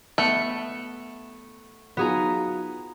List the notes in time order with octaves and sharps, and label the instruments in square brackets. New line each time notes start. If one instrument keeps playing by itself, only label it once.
[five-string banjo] A3 [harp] B3 C#7
[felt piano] F#3 D#4 F4 [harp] B3 G#4 A#5